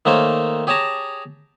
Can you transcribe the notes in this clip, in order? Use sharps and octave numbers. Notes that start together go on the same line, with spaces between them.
D#3 A3 A#3 C5 C#5
G4 G#4 C#5 A5 A#5